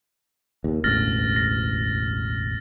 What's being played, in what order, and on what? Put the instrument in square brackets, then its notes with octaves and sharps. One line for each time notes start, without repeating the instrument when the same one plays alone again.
[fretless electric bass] D#2
[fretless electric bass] E1 A1 D2 [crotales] F6 A6 A#6
[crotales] A#6